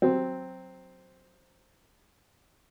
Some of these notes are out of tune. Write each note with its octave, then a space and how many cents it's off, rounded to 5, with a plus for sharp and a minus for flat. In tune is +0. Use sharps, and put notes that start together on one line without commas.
F#3 +0 C4 +0